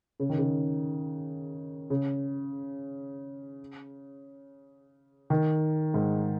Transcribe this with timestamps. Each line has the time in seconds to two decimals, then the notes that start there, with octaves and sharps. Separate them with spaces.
0.20 C#3
0.30 D#3
0.38 C#3
1.90 C#3
5.30 D#3
5.94 G#2